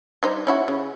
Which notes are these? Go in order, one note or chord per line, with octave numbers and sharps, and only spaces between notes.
G3 D#4 C5
C#4 E4 F#4
C#3